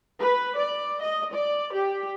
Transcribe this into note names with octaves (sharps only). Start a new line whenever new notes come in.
B4
D5
D#5
D5
G4